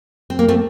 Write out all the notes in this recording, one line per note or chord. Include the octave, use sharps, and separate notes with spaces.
C4
A#3
A3 C4